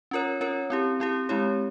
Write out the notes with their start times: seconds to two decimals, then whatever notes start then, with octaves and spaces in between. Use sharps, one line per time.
0.11 C#4 F4 A#4 C#5
0.41 C#4 F4 A#4 C#5
0.70 C4 E4 G4
1.00 C4 E4 G4
1.29 G#3 C4 E4 G4 C#5